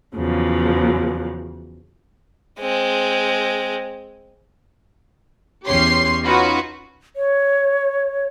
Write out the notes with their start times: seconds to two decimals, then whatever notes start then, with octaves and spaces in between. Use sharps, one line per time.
0.16 E2 C#3 F3 F#3
2.60 G#3 C4
5.66 E2 C#4 G4 C#5 C6 C7
6.24 C#4 D#4 F4 F#4 B4
7.16 C#5